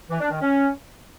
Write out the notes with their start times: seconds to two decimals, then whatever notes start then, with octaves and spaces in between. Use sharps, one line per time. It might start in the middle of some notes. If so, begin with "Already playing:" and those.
0.10 E3
0.20 D4
0.31 D#3
0.41 C#4